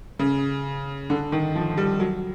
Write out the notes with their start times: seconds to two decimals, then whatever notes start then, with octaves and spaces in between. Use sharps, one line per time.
0.19 C#3
1.10 D3
1.32 D#3
1.55 F3
1.77 G3
2.00 F#3